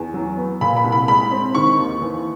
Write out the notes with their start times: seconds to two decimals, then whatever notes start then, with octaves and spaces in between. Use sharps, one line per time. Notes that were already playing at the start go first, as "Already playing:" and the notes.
Already playing: E2
0.14 F#3
0.37 B3
0.61 A#2 B5
0.76 B5
0.84 C2
0.92 B5
1.08 G#3 B5
1.31 C4
1.55 D#3 C#6
1.79 D#2
2.01 E3